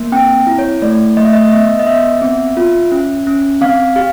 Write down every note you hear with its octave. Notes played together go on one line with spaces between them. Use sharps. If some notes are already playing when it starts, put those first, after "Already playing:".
Already playing: A#3
C4 G5
E4
C#5
A3 D5
A3 D#5
E5
D#5
D#5
B3 E5
D#5
B3 E5
C4
F4
C#4
C#4
C4 F5
G4 F5